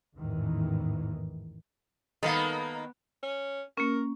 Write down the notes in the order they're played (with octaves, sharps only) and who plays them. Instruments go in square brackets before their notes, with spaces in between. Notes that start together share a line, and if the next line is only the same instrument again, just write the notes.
[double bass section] A1 E2 G#2 D#3 E3
[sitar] D#3 A#3 [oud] B3 B4 [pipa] D#4 [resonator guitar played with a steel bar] A4 F5
[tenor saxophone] C#4
[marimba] A#3 C#4 [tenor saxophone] A#4